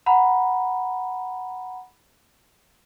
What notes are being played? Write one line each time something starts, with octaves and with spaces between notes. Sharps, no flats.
F#5 A#5 B5